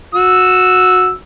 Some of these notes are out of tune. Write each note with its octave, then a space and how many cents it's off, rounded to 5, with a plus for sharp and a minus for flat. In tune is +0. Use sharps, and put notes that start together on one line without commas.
F#4 -15 E6 +0